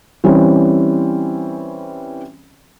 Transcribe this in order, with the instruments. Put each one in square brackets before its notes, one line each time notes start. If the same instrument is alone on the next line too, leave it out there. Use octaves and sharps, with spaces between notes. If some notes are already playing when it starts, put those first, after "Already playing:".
[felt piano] E3 G3 C4 C#4